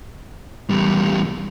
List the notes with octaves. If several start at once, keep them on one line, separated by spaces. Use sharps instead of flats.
E2 G3